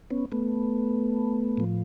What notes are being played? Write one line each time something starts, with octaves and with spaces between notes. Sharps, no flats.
B3 C#4
A3 B3
A2 F3